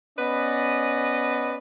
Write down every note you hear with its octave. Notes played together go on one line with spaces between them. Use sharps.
B3 C#4 B4 D5 D#5